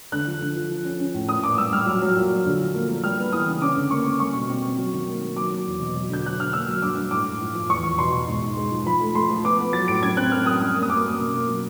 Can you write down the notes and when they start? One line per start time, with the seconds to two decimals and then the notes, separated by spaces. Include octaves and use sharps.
0.12 D3 F#6
0.27 F3
0.41 D3
0.56 F3
0.71 F3
0.85 C#4
1.00 C#4
1.14 A2
1.29 A#2 D#6
1.43 A#2 D6
1.58 G3 E6
1.72 G3 F6
1.86 F#3
2.02 F#3
2.16 A#2
2.31 F#3
2.45 D3
2.60 F3
2.74 A#3
2.89 A#3
3.04 G3 F6
3.19 B3
3.32 E3 D#6
3.47 C#3
3.62 C#4 D6
3.76 D3
3.91 A#3 C#6
4.05 A#3
4.20 G3 C#6
4.35 B2
4.49 C4
4.64 C4
4.78 F#3
4.93 D#3
5.07 A#3
5.22 A#3
5.36 F#3 D6
5.51 F#3
5.66 E2
5.80 B2
5.95 F#3
6.09 D3 G6
6.24 F#3 F#6
6.38 D3 F6
6.53 A#3 E6
6.68 F#3
6.82 G2 D6
6.97 G2
7.11 A2 D6
7.26 A2
7.41 F3
7.55 F3
7.69 E2 C#6
7.84 E2
7.99 B2 C6
8.13 B2
8.27 G#2
8.42 G#2
8.57 G#3
8.72 F3
8.86 F3 B5
9.01 A3
9.15 A3 C6
9.30 F3
9.44 B3 D6
9.59 B3
9.73 F#3 A6
9.88 A2 D7
10.02 F#2 G#6
10.17 C4 F#6
10.32 F#2 F6
10.46 F#2 D#6
10.61 G3 D#6
10.76 A#3
10.82 D#6
10.90 A#3 D6
11.04 A#3
11.20 B2
11.34 A#3
11.48 F#3